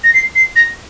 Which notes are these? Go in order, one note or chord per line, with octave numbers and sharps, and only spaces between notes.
A#6
C7
C7
A#6